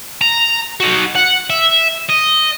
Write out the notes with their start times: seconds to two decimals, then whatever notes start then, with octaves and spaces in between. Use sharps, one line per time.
0.21 A#5
0.80 D#4 F#4
1.15 F#5
1.50 E5
2.10 D#5